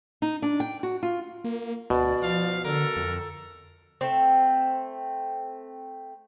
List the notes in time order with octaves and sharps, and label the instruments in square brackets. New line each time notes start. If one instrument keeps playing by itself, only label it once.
[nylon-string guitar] D#4
D4
G5
F#4
F4
[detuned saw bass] A#3
[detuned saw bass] D2 [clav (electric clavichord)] B2 [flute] D5
[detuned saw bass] F3 [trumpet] F5
[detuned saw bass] D3 [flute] A4 [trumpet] A#4
[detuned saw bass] F2
[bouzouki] A3 C4